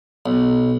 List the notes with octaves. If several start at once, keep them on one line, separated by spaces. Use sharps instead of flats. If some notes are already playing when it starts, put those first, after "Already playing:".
B1